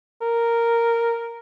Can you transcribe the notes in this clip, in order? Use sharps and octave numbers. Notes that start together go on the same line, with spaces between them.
A#4